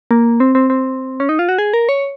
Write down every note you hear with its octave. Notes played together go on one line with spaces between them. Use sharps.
A#3
C4
C4
C4
C#4
D#4
F4
F#4
G#4
A#4
C#5